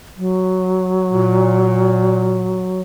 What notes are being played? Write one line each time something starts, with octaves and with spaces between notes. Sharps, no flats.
F#3
A#2